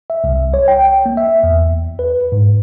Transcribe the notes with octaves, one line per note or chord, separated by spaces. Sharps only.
E5
C2
C#5
G5
A#3
E5
E2
B4
G#2